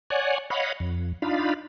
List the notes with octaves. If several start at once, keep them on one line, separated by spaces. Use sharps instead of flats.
C#5 D5 F#5 G#5
C#5 D#5 F5 F#5 B5
F2
D4 D#4 F4 F5 B5